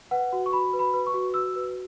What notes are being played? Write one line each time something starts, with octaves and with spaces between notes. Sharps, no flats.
B4 F#5
F#4
C#6
F#4 B5
B4
B5
B4
C#6
F#4
F#4 E6
B4